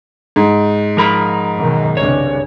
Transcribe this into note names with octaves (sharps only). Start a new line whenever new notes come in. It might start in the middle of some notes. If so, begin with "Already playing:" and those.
G#2
F3 A#4 B5
F#2 B2 D#3
C2 G2 C#3 C#5